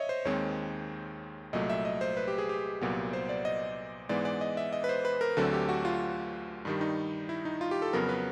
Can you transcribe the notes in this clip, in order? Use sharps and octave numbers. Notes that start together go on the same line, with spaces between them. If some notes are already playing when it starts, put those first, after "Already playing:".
Already playing: C#5 D#5 E5
C5
D#2 D#3 G#3 C4 C#5
C2 A#2 F#3 A3 D#5
E5
D#5
C5
B4
G4
G#4
G4
C2 A#2 F#3 B3
C5
D5
D#5
G#2 E3 G#3 B3 D5
D5
D#5
E5
D#5
B4
C5
B4
A#4
D2 D3 F#3 A3 C4 A4
G4
F#4
F4
G2 D#3 G3
D#4
E4
D#4
F4
G4
A4
F2 C#3 F#3 B3 A#4
B4